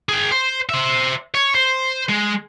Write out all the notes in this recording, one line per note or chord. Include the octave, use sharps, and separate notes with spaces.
G#4 G5
C5
C5 E5
C#5
C5
G#3